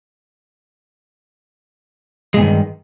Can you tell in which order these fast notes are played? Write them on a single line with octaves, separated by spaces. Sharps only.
G#3 A#2 G2 D#3